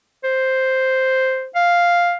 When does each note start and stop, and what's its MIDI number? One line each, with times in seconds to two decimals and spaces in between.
0.24 1.47 72
1.55 2.16 77